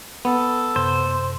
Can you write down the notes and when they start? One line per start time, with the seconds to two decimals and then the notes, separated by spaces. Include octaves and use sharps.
0.25 B3 A4
0.76 F#2 C3 C5